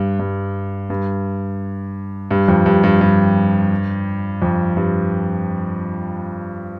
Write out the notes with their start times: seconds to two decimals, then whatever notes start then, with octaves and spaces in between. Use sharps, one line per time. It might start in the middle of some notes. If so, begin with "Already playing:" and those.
Already playing: G2
0.19 G2
0.90 G2
2.31 G2
2.48 F2
2.66 G2
2.84 G2
3.01 G2
4.42 F2
4.77 G2